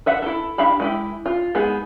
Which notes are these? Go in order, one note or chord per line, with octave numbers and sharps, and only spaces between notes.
B4 E5 F#5
E4 A4
D4 G4 E5 F5 B5
G#3 E4 G4
F4
G#3 B3 D#4 G#4